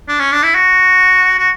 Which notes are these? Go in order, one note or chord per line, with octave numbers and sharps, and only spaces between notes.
D4
C#4
D4
E4
F#4
F#4